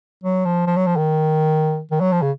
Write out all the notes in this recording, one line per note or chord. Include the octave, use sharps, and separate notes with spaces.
F#3
F3
F3
F#3
F3
D#3
D#3
F#3
F3
C#3